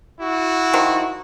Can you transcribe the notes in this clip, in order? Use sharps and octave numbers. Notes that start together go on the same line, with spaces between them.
E4 F#4
D#3 F3